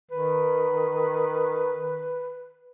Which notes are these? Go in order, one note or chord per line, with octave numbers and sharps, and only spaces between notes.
D#3 B4